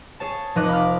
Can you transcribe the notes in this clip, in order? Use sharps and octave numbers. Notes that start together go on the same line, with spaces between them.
G#4 C#5 A5
F1 F3 D#4 D#5 D6 F#6
B5 D6 F6